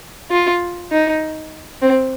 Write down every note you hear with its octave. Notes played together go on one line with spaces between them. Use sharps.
F4
D#4
C4